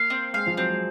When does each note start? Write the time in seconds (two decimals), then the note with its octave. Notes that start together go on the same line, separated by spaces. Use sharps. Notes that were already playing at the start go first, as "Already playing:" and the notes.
Already playing: A#3 F5
0.10 C4
0.33 G#3 F5
0.46 F3
0.57 F#3 C4
0.70 G#3